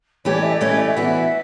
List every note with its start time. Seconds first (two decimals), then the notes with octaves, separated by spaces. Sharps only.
0.25 E3 A3 C#4 G4 C#5
0.34 D5
0.43 E5
0.52 D5
0.61 E3 A3 C#4 G4 C#5
0.70 E5
0.78 D5
0.88 E5
0.96 E3 B3 F#4